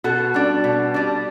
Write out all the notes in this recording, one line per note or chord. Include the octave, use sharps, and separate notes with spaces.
B2 F#4 A4
G3 D4
B2
G3 D4